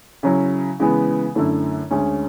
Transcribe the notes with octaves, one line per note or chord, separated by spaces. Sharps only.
C#3 F#3 C#4 E4
C#3 E3 G#3 B3
F#2 D3 A3 E4
D2 D3 G#3 C#4